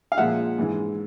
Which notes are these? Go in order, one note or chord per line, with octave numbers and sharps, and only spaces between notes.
F5
A#2 F3 G#3 E5 F#5
G#2 E3 G#3